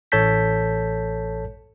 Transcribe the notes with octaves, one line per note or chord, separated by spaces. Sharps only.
A1 A4 C#5 A5 G6 B6